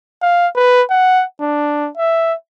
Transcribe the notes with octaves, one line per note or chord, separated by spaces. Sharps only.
F5
B4
F#5
D4
E5